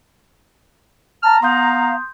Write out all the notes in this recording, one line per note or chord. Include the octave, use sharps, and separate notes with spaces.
A5 A#5 F6
B3 F5 C6 D#6 G6